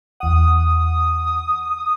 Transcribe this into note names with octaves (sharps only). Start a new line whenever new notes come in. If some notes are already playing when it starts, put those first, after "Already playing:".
E2 F#5 D#6